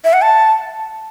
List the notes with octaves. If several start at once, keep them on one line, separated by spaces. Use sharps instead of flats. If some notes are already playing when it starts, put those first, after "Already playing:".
E5
F#5
A5